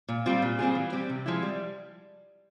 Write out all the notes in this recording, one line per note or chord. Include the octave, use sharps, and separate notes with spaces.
A#2
G3 C4 F4
A#2
G3 C4 F4 G#4
E3
G3 C4 G4
C3
F3 G#3 E4
G3